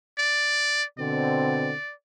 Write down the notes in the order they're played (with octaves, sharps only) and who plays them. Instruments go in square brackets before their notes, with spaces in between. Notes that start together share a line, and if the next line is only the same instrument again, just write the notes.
[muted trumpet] D5
[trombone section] B2 D3 C4 [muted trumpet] D5